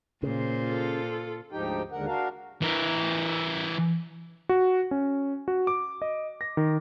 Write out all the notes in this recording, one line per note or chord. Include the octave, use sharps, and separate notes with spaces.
A#2 C#3 C5
F4 A4
D2 G#2 F3 D#4 G4 G5
D#2 G#2 D3 A#4 F#5
D4 F#4 A#4 F5
E3 A#4
F#4
C#4
F#4
D6
D#5
A#6
D#3